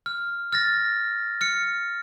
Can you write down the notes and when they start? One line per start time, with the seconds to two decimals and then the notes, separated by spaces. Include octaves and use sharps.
0.06 F6
0.52 F6 A6 A#6
1.41 F6 C#7